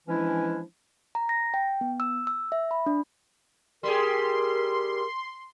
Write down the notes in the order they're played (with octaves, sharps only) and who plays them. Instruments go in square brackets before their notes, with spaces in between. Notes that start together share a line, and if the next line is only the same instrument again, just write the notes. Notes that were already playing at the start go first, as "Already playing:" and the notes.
[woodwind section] E3 F3 G#3 C#4 D4 E4
[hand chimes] A#5
A#6
G5
B3
E6
E6
E5
B5
D4
[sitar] G3 G4 G#4 [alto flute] A#4 [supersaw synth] C6